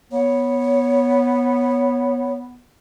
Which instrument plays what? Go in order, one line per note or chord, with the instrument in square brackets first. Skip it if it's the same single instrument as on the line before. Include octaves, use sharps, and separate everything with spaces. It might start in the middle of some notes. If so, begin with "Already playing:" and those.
[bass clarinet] B3 [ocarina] C#5